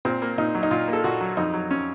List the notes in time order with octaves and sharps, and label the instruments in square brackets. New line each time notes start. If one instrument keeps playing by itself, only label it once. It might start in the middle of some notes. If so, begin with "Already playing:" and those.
[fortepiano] A#2 C4
A#3
A#2 D#4
F#3
D#4
A#2 F4
A#3
A4
A#2 F#4
F#3
F2 D#4
F#3
C#4